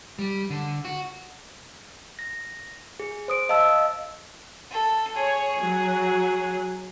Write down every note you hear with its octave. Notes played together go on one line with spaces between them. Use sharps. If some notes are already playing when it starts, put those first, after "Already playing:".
G3
D3
F#4
A#6
G#4
C5 D#6 D7
D#5 F5 A5 E6
A4
G#4 C#5
F#3